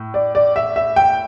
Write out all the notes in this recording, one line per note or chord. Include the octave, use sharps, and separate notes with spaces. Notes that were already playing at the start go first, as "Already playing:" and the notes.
Already playing: A2
D5
D5
E5
E5
G5